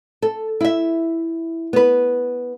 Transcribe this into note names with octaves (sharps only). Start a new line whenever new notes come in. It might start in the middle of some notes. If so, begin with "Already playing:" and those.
A4
E4 E5
B3 B4